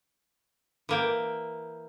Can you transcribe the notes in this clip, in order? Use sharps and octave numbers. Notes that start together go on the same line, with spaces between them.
E3 A#3 G5